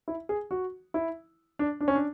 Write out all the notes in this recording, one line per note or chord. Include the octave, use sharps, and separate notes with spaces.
E4
G#4
F#4
E4
D4
D4
C#4
D4